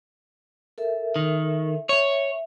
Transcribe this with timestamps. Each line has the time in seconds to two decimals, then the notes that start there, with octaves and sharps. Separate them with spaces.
0.78 A4 A#4 E5
1.16 D#3
1.89 C#5 E5